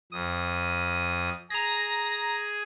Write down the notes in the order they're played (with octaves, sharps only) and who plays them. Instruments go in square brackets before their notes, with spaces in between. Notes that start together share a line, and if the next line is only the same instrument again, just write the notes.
[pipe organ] F2 D#6
[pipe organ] G#4 [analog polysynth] A#5 A#6